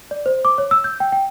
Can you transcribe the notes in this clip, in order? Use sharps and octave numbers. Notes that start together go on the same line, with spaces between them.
D5
C5
D6
C#5
E6
G6
G5
G5